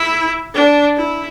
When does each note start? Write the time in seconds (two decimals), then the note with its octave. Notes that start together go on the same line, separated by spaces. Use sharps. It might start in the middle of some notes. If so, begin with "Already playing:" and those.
Already playing: E4
0.55 D4
0.97 E4